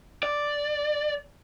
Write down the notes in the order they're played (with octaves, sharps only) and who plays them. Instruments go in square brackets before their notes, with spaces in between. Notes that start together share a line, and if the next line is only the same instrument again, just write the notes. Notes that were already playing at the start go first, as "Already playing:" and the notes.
[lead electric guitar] D5